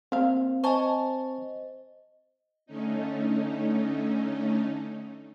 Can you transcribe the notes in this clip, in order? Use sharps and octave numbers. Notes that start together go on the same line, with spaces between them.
A#3 C4 F5
C5 D#5 G#5 A5 C#6
D3 A3 C#4 D#4